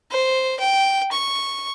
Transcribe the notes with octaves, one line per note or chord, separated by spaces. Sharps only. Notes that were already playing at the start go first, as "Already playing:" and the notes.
C5
G5
C#6